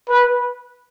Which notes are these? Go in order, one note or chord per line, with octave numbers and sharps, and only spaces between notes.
B4